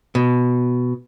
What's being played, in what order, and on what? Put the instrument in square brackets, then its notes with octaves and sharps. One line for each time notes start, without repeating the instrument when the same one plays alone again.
[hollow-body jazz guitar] B2